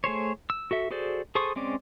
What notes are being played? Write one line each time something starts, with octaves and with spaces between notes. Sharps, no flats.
A3 G#4 C5 C#5
E6
F#4 A4 E5
F#4 G#4 A4 C5 D5
G#4 A4 C5 C#6 D#6
G#3 C4 C#4 D5